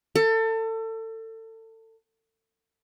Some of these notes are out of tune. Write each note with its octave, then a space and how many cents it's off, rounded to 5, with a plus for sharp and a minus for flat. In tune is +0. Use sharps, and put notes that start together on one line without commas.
A4 +30